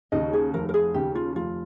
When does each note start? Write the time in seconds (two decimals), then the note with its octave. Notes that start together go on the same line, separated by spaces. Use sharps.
0.12 D#2 C#3 D#5
0.33 G#4
0.54 F1 A#4
0.69 A#4
0.74 G#4
0.94 D#2 C#3 G4
1.15 F4
1.35 F1 F4